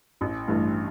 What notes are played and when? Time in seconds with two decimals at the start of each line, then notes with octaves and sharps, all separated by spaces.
0.21 A1
0.48 G2 E3 A3